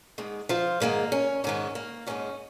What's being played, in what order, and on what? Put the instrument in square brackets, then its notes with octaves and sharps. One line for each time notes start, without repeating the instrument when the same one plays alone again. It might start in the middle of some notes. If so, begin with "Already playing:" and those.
[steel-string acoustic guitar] G#2 D#3 G#3
F3 F4
G#2 D#3 G#3 A#3
C#4
G#2 D#3 G#3 C#4
A#3
G#2 D#3 G#3 C#4